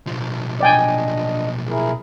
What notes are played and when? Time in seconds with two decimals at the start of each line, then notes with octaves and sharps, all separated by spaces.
0.07 B1 F3
0.61 D4 D5 D#5 G5 G#5
1.69 E4 G#4 A#4